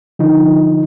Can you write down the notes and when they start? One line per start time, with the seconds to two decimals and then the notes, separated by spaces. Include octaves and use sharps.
0.19 D3 F3 D#4